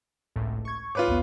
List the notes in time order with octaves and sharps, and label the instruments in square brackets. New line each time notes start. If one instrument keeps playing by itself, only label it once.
[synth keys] G#1 C#2 A2
C#6 G#6
[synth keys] G#2 F5 D6 [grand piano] F4 B4 C#5
[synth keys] B1 E2 B3